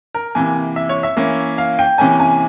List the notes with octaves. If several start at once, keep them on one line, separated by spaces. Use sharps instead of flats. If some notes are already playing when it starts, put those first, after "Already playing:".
A#4
C3 E3 A#3 G#5
E5
C#5
E5
E3 A#3 C#4
F5
G5
C3 E3 A#3 C#4 G#5
G#5